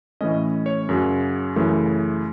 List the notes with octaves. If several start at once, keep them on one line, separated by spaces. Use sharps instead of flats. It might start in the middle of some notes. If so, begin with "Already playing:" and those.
A2 E3 A3 C#4 D#5
C#5
F#2 C#3 F#3
F#2 C#3 E3 A3